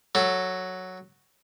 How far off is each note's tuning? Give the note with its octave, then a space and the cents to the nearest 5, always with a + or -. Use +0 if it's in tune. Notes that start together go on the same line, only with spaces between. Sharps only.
F#3 +0 A4 +5